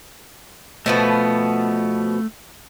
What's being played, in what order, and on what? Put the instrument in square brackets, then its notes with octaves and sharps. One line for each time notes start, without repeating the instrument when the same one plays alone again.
[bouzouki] B2 F3 B3 [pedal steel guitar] A3